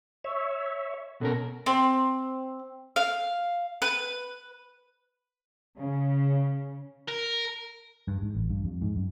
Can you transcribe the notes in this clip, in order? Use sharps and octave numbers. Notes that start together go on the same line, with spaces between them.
C#5 E5
B2 C#4 A4 A#4
C4
F5
B4
C#3
A#4
G2
G#2
A1
G2
F2
G#2
F#2